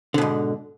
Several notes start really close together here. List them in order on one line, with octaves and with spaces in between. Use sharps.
D3 B2 G#2